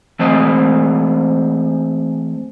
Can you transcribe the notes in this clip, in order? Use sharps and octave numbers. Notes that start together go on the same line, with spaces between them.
E3 A3 C4 G#4 D#5